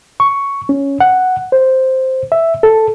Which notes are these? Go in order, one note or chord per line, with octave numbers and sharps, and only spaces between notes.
C#6
C#4
F#5
C5
E5
A4